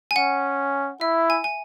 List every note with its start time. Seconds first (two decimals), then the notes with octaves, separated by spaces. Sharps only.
0.11 G#5
0.15 C#4 F#5
1.01 E4 E5
1.30 G#5
1.44 G#5